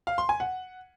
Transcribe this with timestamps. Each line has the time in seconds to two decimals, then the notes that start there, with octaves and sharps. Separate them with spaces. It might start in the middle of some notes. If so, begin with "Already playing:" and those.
0.07 F5
0.18 C6
0.29 G#5
0.40 F#5